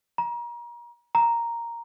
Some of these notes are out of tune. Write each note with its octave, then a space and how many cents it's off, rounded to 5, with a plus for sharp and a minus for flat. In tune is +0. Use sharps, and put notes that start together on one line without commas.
A#5 +35
A#5 +0